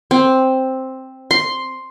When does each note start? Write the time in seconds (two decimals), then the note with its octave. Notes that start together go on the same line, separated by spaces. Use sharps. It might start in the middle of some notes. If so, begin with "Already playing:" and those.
0.11 C4
1.31 C6